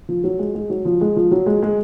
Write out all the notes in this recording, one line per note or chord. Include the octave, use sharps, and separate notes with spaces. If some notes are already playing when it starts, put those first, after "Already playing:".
F3
F#3
G#3
G#3
F#3
F3
G#3
F3
F#3
G#3
G#3